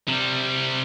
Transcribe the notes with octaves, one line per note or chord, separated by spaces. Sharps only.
C3 G3